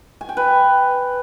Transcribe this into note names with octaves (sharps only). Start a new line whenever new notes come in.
G#5
G5
B4